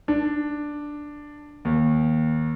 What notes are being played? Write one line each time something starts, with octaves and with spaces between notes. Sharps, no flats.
D4
D#2